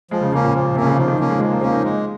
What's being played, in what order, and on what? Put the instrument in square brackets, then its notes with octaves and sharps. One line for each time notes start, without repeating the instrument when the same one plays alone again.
[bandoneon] F3 [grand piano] G#3
[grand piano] C#3
[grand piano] C#3 [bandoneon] A#3 C#4
[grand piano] A#2
[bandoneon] F3
[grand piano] A#2
[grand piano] C3 [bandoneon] A#3 C#4
[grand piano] C#3
[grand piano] D#3 [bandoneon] F3
[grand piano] D#3
[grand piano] F3 [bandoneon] A#3 C#4
[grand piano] G#3
[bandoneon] F3 [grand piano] G#3
[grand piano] A#3
[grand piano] C4 [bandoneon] C#4
[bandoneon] A#3
[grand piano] D#4
[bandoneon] G#3